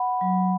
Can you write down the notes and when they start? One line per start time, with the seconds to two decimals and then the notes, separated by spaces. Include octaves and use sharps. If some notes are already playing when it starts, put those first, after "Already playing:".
Already playing: F#5 B5
0.21 F#3